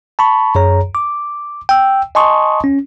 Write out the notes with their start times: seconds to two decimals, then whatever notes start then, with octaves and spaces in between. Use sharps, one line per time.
0.19 A5 B5 C#6
0.55 F#2 G#4 C#5 A#5
0.95 D6
1.69 G5 E6
2.15 D#5 G#5 A5 C6 C#6 D#6
2.64 C#4